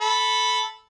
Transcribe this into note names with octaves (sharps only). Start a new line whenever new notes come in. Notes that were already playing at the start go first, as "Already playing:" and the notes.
A4 B5